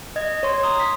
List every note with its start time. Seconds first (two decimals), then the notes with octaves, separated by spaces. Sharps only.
0.16 D#5 G#6
0.43 C#5 C6
0.64 A#5 C6 D#6
0.80 B6